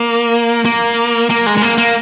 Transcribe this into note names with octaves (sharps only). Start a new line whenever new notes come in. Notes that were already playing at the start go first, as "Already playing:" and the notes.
Already playing: A#3
A#3
A#3
G#3
G#3
A#3
A#3